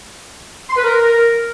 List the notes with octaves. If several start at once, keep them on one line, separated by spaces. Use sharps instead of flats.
C6
B4
A#4